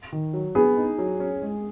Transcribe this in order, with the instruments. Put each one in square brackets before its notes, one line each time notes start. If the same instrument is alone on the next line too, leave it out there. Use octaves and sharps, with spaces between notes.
[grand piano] D#3
F#3
[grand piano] B3 [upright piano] G#4
[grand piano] D#4
F#3
C#4
G#3